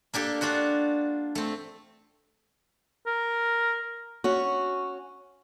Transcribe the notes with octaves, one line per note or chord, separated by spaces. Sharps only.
A#3 D4 G4 A4
D4 F4 F#4 F#5
A3 C4
A#4
C#4 F#4